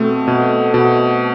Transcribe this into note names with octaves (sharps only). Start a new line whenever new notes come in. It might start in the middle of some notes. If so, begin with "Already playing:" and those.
Already playing: B2 A3 C4
B2
B2